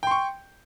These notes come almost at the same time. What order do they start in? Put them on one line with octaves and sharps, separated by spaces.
G5 C6 C#6